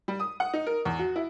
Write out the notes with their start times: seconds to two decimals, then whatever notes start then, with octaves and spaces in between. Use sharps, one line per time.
0.08 G3
0.20 D#6
0.40 F#5
0.54 D#4
0.67 A#4
0.85 E2
0.99 F#4
1.16 E4